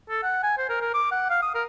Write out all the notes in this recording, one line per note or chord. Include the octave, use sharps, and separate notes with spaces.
A4
F#5
G#5
C5
A#4
A#4
D6
F#5
F5
D#6
A#4